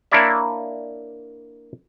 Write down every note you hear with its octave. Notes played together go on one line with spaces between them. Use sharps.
A#3 D4 E4 C#5 D5 E5